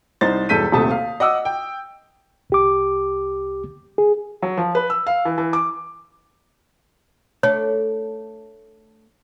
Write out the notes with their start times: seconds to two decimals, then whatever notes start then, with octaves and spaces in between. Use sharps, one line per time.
0.21 C2 D#4 C5 A6
0.49 E1 G2 A4 G6 B6 D#7
0.72 D#1 C3 A3 A5 D#6
0.91 F5
1.20 D#5 F#5 D6 E6
1.45 G5
2.50 C2 G4 D6
3.98 G#4
4.42 F#3
4.57 F3
4.75 B4
4.90 E6
5.07 F5
5.25 E3
5.38 E3
5.53 D6
7.43 A3 D4 C#5